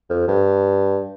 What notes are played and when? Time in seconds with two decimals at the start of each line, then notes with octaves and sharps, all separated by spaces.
0.10 F2
0.28 G2